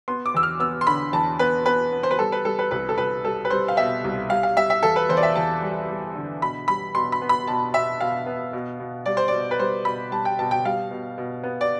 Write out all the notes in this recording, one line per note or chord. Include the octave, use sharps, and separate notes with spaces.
B3 C6
D6
E2 E6
F6
B3 E6
C6
D3 B5
E2 A5
B3 B4
B3 B4
B3
C5
B4
G3 A4
B4
G3 A4
B4
C2 B4
A4
C2 B4
G3 A4
B4
G3 C5
F5
B2 E5
C2
G3 F5
F5
G3 E5
E5
E2 A4
B4
E2 C5
D5
E5
E2 A5
G3
G3
D3
B2 B5
G3 B5
B2 C6
B5
B3
B5
B2 A5
B2 E5
B2 F5
B3
B2
B2
G3 D5
C5
B2 D5
B4
G3 C5
B2 B5
G3 A5
G5
B2 A5
G5
G3 F5
B2
B2
B3
D5